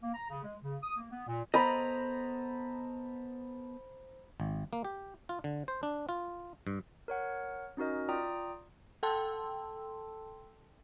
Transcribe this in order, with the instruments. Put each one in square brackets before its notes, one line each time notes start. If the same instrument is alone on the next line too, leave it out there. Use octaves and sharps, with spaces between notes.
[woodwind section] A#3
A#5
C#3
G#3
C#3
D#6
A#3
B3
A#2
[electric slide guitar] B3 A4 D#5 [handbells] C5 [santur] A#5 B5
[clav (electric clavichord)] G#1
A#3
G4
F4
D3
C5
D4
F4
G2
[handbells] A#4 C#5 F#5
C#4 D#4 F#4 A#4 D#5
F4 D5 G5 A#5 D#6
[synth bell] A4 G5 A5 C6 E6